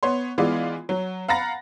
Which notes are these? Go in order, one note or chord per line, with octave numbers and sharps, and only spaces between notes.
B3 C#5 C6
E3 G#3 B3 F4 D5
F#3
F5 F#5 A#5 B5 A6 A#6